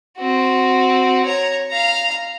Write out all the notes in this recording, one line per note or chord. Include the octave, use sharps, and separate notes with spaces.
C4 F#4
C#5 A#5
F5 A#5